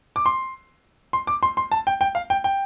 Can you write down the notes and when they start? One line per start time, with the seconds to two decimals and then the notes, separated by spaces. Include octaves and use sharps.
0.16 D6
0.26 C6
1.13 C6
1.27 D6
1.43 C6
1.57 C6
1.72 A5
1.87 G5
2.01 G5
2.15 F5
2.30 G5
2.44 G5